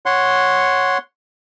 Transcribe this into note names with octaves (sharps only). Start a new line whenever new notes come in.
C#5 F#5 C6